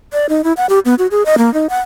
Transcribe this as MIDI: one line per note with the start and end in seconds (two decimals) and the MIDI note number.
0.13 0.26 74
0.29 0.44 63
0.44 0.53 64
0.57 0.66 78
0.69 0.79 67
0.85 0.95 59
0.99 1.07 66
1.11 1.23 68
1.26 1.36 75
1.38 1.52 58
1.54 1.67 63
1.69 1.79 78